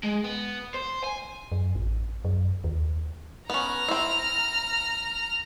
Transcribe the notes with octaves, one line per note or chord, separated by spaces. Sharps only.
G#3
B3
C5
G#5
F#2
A1
F#2
D#2
B3 C#4 A#5 F6
C4 E4